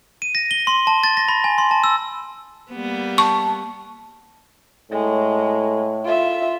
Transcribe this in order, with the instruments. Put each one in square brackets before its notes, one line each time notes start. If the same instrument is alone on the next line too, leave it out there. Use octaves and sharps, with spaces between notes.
[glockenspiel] D#7
A#6
G7
C6
A5
A6
A#6
B5
G#5
C6
A5
E6
[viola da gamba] G3 A#3 B3
[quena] A5 [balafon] C#6
[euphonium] A2 [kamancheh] G#3
[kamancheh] F4 E5